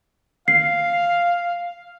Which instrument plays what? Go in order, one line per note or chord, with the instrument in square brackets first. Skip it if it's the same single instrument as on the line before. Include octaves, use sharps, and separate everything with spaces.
[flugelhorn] F5 [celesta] C7